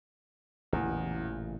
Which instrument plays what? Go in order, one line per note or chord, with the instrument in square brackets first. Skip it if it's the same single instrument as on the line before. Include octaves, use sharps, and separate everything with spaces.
[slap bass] A1 A#2 C#3 [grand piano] E2